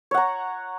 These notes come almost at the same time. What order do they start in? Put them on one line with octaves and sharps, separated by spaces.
C#5 F#5 A#5